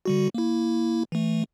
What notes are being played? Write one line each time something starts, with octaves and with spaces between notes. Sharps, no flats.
D3 G3 F#4
A#3 E4
E3 A3